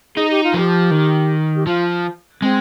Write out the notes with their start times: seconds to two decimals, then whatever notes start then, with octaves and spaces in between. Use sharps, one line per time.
0.16 D#4 G#4
0.30 G4
0.44 F4
0.54 F3 G4
0.91 D#3
1.56 G4
1.67 F3 F4
2.41 G#3 C4